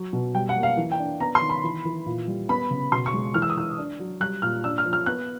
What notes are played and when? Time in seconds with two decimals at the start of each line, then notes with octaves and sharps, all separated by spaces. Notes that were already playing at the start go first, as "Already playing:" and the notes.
Already playing: F#3
0.13 B2
0.34 G3 G5
0.49 F#5
0.57 A#3
0.63 F5
0.77 E3
0.92 G5
0.99 D4
1.20 B3 A#5
1.35 C6
1.42 D#3
1.50 B5
1.64 E3
1.85 E3
2.06 A#2
2.27 G3
2.49 B3 B5
2.70 C#3
2.92 B2 C6
3.06 C#6
3.14 G#3
3.34 E3 F6
3.42 E6
3.50 D#6
3.57 E3 E6
3.78 D4
4.00 F#3
4.20 G3 F#6
4.42 A#2 F6
4.64 D4 E6
4.78 F6
4.85 F3
4.93 F6
5.06 B3 F#6